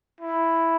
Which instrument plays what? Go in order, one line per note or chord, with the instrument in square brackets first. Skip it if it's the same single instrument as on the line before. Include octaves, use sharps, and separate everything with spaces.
[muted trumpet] E4